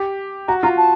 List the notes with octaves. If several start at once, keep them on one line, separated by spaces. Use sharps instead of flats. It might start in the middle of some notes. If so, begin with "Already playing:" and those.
Already playing: G4
F#4 A#5
F4 A#5
A5